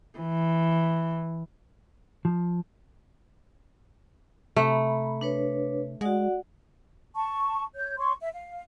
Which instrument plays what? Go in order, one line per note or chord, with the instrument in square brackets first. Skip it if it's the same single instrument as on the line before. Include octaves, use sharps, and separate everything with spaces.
[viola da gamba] E3
[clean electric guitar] F3
[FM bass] C3 [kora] A3 [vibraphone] A#5 B5
[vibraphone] D4 B4 C#5
[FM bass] G#3 [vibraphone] F#4 D5 F#5
[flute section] A5 C#6
C#5 G6
C#5 C6 C#6
E5
F5